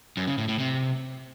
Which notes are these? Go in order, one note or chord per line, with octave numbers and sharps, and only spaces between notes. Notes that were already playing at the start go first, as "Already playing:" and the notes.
F#2
C#3
A2
A2
C3